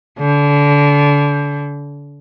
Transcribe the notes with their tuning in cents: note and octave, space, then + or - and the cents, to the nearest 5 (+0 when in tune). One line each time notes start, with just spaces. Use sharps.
D3 -25